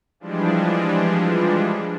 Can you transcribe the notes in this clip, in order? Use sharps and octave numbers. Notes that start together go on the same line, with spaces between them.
E3 F3 G3 G#3 D4